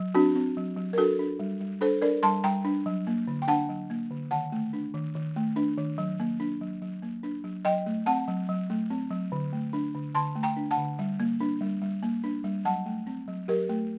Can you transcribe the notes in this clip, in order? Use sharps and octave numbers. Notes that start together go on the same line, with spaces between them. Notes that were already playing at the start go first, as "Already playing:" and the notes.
Already playing: F#3
C4 D4 F#4
C4
F#3
F#3
A#4
D4 F#4 A4
D4
G3
G3
D4 A4 C5
D4 A#4 D5
G3 A5 C6
G3 G5 A#5
D4
F#3
A#3
D3
G5
D4 F#5 A5
F#3
A#3
D3
D#3 F#5 A5
A3
D4
D#3
D#3
A3
D4
D#3
F#3
A#3
D4
F#3
F#3
A#3
D4
F#3
F#3 D#5 G5
A3
C4 F#5 A5
F#3
F#3
A3
C4
F#3
D3
A3
D4
D3
D3 A5 C6
A3
G5 A#5
D4
F#5 A5
D3
G3
A#3
D4
G3
G3
A#3
D4
G3
F#3 F#5 A5
A3
C4
F#3
F#3 G4 A#4
A3